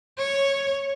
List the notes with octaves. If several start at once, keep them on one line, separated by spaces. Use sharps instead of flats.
C#5